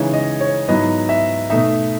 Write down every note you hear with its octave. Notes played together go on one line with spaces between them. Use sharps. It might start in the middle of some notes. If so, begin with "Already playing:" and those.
Already playing: C#3 E3 G#3 D#4 C#5
D#5
C#5
G#2 F#3 B3 E4 D#5
E5
B2 A3 D#4 E5